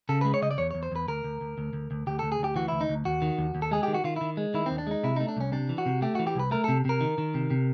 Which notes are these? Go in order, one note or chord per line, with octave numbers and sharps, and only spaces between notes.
C#3 A4
G#3 B4
C#5
C#3 D#5
D5
E2 C#5
E2 C#5
C5
E2 B4
D2 A#4
D2
D2
D2
D2
D2
D2 G4
D2 A4
G#4
D2 G4
E3 F#4
D2 E4
D#4
D2
D#2 F#4
D#3
D#2
D#2
A4
G#3 G#4
D#3 G4
F#4
D#3 F4
D#3 E4
G#3
D#3 E4
D#2 C4
D4
G#3 D#4
C3 E4
A3 D#4
D4
C2 C#4
C3 D4
E3
F#4
C3
A3 G4
E3 F#4
G4
C2 B4
A3 A#4
C3 A4
C3 A#4
D#3
D#3
C3
C3